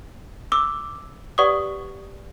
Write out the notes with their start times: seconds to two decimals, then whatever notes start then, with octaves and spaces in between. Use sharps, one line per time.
0.52 D6 E6
1.38 G4 B4 D5 F#5 C#6 D#6